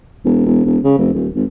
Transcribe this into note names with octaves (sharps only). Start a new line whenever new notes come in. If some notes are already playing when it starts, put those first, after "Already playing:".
E1
E1
E1
C#3
F1
D#1
G#1